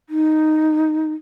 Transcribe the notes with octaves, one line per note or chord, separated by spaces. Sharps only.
D#4